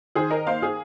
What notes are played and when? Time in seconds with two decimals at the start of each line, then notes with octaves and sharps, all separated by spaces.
0.15 D#3 G#4 C5
0.30 A#4 D#5
0.46 A#3 C5 F5
0.62 G#4